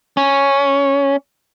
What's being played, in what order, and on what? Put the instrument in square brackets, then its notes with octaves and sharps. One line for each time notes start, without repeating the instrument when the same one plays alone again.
[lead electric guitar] C#4